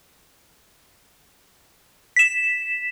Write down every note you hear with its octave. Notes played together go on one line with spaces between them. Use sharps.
B6 E7